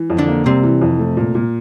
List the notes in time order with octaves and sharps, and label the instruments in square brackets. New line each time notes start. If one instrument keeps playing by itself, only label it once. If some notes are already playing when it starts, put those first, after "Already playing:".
Already playing: [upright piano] E3
F2
[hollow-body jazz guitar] D3 D4
[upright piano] A#3
[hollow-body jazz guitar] C3 C4 [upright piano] G3
[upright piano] E3
F2
A3
A#2
A#2